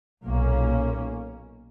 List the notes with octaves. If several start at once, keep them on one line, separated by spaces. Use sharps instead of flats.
B1 A#2 A#3 C#4